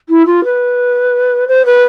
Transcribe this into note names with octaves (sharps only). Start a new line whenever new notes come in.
E4
F4
B4
C5
B4